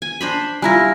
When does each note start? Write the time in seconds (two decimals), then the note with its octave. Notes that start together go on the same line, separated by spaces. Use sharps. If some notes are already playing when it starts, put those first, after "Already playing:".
0.02 G#5
0.21 D4 C5 B5
0.62 G3 E4 F4 G#5 A#5 A#6